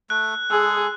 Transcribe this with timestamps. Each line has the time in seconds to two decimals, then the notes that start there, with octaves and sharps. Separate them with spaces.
0.10 A3 F#6
0.50 G#3 G#4 A4